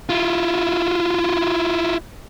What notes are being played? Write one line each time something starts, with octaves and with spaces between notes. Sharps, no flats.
E4 F4